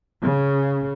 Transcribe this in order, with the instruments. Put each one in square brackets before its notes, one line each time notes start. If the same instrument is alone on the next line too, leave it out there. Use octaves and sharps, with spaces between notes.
[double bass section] C#3